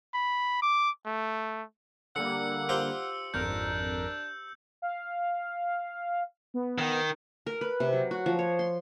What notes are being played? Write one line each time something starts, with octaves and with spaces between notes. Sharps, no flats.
B5
D6
A3
D3 G3 A#3 F#5 E6 C#7
F4 G4 C5 E6
G#1 F2 D4 A#4 G6
F5
B3
D#3
A#4
B4
C3
F#3
F#4
F3
C#5
C6